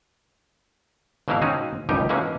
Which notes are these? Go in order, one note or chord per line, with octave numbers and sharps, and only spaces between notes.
G#1 B2 E3 A#3 E4 F5
C4 C#4 D#4 F#4 G#4
G#1 C#2 F#2 G3 D#4 G4
B2 D#3 E3 G#3 A#3 C#4